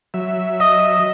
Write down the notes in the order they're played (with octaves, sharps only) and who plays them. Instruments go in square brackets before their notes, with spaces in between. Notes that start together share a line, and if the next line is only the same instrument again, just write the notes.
[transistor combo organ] F#3 E5
[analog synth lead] D#5